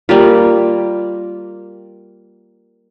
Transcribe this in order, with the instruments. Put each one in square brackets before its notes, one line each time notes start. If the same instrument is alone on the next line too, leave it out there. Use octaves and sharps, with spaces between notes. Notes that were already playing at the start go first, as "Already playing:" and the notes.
[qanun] G3 A#3 F4